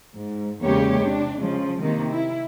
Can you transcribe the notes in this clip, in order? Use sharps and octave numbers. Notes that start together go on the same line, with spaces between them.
G#2
E2 C#3 G#3 A#3 G4 C#5
C3 D4
C#3 F3 G#3
C3 D#3 A#3
E4